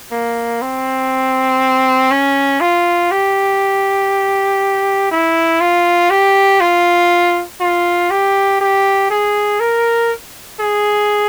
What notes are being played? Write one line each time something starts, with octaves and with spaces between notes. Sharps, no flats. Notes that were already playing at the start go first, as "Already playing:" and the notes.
A#3
C4
C#4
F4
G4
E4
F4
G4
F4
F4
G4
G4
G#4
A#4
G#4